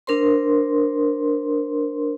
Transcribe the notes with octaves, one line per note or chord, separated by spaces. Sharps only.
D4 A#4 C5 C6